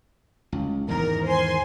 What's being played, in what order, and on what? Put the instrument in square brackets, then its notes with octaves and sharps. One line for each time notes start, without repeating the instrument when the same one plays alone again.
[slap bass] C#2
[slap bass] E2 G#2 D#3 [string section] A#4
[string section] C5 G#5 C6